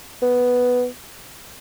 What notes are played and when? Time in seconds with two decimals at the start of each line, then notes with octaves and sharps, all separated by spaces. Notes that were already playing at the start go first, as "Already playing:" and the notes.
0.22 B3